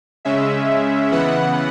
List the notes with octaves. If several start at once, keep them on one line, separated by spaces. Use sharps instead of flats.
C#3 G#3 C#4 E5
C#3 E3 B3 F#5